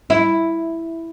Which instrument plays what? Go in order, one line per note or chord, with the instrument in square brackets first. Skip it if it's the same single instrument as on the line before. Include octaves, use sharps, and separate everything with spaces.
[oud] E4